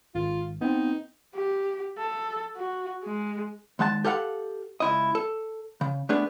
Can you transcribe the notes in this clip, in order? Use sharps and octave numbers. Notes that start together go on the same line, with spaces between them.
G#1 F4
B3 C4 D#4
G4
A4
F#4
G#3
D#2 G#3 F#5 A5
G4 A4 F5 F#5
C#2 E4 D#5
A4
C#3
A3 B3 D4 G#4